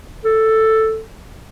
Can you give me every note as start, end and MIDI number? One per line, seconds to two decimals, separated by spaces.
0.25 1.01 69